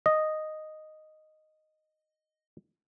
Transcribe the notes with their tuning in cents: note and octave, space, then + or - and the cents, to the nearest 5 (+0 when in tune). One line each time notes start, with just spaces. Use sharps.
D#5 -5